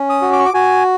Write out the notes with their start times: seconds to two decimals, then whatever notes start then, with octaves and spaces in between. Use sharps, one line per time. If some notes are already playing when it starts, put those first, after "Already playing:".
Already playing: C#4
0.10 D#6
0.22 F#4
0.33 D6
0.39 C#6
0.46 D6
0.54 F#4 G#5